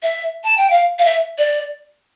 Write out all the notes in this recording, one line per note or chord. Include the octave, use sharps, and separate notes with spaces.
E5
A5
G5
F5
F5
E5
D5